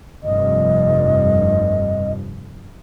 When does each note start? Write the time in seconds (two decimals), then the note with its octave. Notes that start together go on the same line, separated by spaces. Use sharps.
0.24 F1 G2 F3 D#5